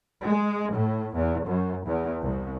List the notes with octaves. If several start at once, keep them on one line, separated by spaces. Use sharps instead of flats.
G#3
A2
E2
F#2
E2
C2